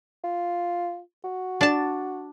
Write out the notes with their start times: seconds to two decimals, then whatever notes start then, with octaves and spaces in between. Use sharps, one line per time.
0.24 F4
1.24 F#4
1.61 D4 A5